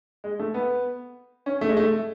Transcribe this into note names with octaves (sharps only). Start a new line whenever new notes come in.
G#3
A3
B3
C#4
A3
G#3
A3